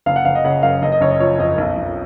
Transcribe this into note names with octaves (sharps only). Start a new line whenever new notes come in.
F#1 F5
F#5
F#1 F5
D#5
C#3 F#5
F#2 F5
F#1 D#5
D#5
F#1 C#5
D#5
F3 C#5
F2 D#5
B1
B1